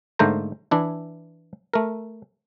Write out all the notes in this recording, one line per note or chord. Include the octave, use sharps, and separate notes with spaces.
G#2 D3 A3 A#3 C5 A#5
E3 D4 E4
A3 A#4